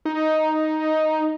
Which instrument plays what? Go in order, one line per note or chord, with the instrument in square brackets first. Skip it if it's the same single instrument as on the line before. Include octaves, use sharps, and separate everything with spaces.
[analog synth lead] D#4